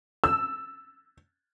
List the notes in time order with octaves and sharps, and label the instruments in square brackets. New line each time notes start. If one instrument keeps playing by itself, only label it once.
[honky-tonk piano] E6